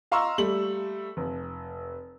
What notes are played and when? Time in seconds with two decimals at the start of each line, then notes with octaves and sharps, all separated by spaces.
0.12 D#5 F5 A#5 C6 C#6 E6
0.38 G3 A3 F#7
1.17 F1